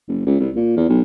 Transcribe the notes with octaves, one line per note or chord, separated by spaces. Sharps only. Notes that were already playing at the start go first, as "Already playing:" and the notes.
F#1
C#2
C2
A#2
E2
B1